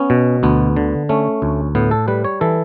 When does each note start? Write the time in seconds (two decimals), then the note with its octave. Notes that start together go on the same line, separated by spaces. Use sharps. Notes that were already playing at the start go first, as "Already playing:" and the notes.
Already playing: B3 C#4
0.10 B2
0.43 D2 B3
0.77 D3
1.09 A3 C#4
1.42 D2
1.75 A2 B3
1.91 A4
2.08 G3 B4
2.24 C#5
2.41 E3 A4